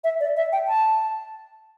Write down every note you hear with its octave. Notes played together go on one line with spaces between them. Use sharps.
E5
D5
E5
G5
A5